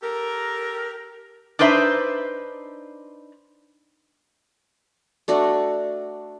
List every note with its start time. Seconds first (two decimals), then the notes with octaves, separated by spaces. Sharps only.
0.02 G4 A4 A#4
1.59 D4 D#4 B4 C5 E5
5.28 A3 D4 F#4